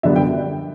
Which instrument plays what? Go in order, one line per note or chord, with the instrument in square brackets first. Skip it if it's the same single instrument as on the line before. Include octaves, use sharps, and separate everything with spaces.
[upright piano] F#2 D3 G3 B3 D4 E5
G5